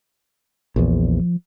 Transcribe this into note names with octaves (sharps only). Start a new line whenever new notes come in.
A#1 E2 F3